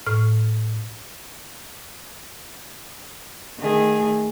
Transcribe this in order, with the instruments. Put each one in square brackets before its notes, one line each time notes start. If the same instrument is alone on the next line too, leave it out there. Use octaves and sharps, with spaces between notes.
[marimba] A2 F6
[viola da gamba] D#3 A3 G#4